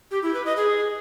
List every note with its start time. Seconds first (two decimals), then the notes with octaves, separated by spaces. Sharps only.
0.11 G4
0.23 E4
0.34 B4
0.45 D#5
0.57 G#4